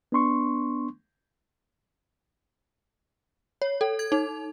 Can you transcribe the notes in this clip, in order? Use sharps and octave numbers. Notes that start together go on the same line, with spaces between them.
B3 D4 C6 C#6
C#5
A4
G#6
D#4